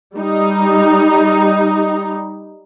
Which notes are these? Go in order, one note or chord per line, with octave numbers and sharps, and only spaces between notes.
G3 D#4